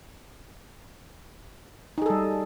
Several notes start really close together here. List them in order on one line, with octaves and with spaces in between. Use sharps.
D#4 G#4 A4 G3